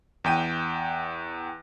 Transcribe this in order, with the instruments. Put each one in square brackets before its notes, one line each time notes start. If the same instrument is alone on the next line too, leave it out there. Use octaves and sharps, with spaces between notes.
[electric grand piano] E2 G5 D#7